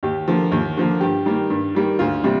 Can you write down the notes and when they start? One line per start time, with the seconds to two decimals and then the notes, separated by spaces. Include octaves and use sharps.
0.03 D#2 G4
0.28 D3 F3 A#3
0.52 D#2
0.77 D3 F3 A#3
1.01 G2 G4
1.26 D#3 G3 A#3
1.50 G2
1.75 D#3 G3 A#3
1.99 D2 F4
2.24 C3 G3